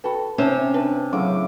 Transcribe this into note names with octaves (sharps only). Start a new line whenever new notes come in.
F#4 A4 B4 G5 B5
C3 C#4 D#4 C5 A5
D4 B4
A2 C#3 F#3 D6